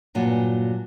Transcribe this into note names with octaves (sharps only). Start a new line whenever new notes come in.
G2 A#2 F#3 G#5